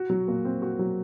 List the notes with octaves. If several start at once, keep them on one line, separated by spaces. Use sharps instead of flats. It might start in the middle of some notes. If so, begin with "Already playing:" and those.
Already playing: F#4
F#3
A#2
C4
F#4
F#3